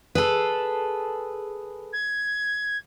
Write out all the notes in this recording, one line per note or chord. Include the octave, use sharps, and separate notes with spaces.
G#4 A4 B4
G#6